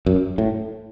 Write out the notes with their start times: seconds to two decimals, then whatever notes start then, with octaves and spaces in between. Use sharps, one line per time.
0.06 F#2
0.38 A2